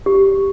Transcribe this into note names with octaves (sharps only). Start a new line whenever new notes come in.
G4